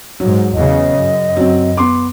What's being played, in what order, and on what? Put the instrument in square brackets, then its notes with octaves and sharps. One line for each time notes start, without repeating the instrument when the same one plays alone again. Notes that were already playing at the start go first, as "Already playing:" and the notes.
[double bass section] G#2 [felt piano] F#3
[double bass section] E2 C#3 [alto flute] D#5
[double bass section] F#2
[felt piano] F#3 C4
B3 C6 D6